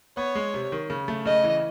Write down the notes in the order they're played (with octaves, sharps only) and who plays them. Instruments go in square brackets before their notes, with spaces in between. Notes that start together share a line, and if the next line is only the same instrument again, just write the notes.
[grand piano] B3 [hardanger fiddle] C#5
[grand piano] G#3
C3
D#3
C#3
A3
[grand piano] C#3 [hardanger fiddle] D#5
[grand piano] E3